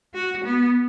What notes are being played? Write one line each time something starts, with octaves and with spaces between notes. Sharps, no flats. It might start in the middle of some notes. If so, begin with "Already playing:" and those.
F#4
B3